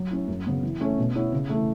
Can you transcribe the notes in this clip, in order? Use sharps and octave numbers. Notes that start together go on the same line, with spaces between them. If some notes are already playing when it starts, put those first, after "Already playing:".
Already playing: F#3
C#4 E4
F#2
C#3 F#3 B3
E3
A3 C#4
B2
B3 E4 C#5
C#3
E3 A3